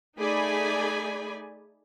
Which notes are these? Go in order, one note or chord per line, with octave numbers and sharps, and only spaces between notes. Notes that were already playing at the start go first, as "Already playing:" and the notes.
A3 D#4 G#4 D5 G#5 B5